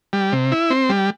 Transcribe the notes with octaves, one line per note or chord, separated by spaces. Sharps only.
G3
C3
E4
C4
G3